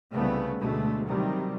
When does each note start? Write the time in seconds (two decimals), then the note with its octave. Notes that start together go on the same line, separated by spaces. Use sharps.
0.13 C2 C#3 G3 A3 B3
0.59 D2 B2 G#3 A3
1.06 C3 D#3 F#3 G3